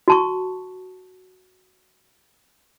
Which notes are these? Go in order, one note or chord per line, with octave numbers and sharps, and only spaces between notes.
F#4 A5 C#6